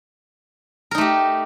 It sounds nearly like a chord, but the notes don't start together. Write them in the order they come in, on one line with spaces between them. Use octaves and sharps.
A#4 D#4 A3 G4